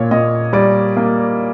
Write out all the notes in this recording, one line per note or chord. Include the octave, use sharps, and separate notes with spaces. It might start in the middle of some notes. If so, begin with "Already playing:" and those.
Already playing: A#2 A#3 C#5
A#2 D#5
G3 D5
A#3